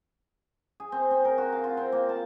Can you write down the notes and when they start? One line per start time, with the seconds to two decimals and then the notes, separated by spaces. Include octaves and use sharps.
0.80 G#4
0.92 C4
1.11 C4
1.25 A#4
1.38 F#4
1.53 F5
1.64 F4
1.77 C4
1.92 A#3
2.09 A5